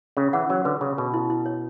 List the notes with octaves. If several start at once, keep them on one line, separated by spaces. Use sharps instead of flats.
C#3 C#4
E3 F#5
F#3 C#4
D3 B4
C#3 C#4
B2 B4
E4
E4
C#5